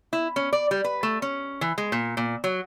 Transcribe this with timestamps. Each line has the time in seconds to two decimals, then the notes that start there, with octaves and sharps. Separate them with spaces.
0.13 E4
0.36 C#4
0.53 D5
0.71 G3
0.84 B4
1.03 A3
1.22 C#4
1.61 E3
1.78 G#3
1.92 A#2
2.17 A#2
2.44 F#3